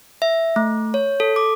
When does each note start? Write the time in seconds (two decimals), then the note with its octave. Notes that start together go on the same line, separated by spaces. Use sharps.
0.22 E5
0.56 A3
0.94 C#5
1.20 A4
1.36 D6